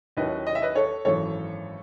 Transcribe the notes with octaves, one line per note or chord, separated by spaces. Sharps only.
D#2 D#3 F#3 C#4 E4 B4 D#5
D#5
E5
B4 D#5
A4 C#5
G#1 F#2 E3 A4 C#5